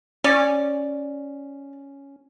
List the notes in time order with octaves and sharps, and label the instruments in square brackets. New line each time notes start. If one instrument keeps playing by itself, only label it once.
[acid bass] C#4 [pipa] D5